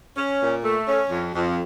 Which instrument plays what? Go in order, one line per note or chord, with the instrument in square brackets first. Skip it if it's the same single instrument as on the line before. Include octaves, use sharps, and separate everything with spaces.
[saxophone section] C#4
A#2
A3
C#4
F2
F2